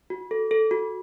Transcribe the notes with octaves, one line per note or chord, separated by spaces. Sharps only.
F#4
A4
A4
F#4